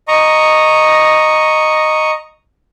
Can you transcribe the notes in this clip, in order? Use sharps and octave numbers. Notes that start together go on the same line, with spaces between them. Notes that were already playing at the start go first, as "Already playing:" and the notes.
D#5 A#5 C#6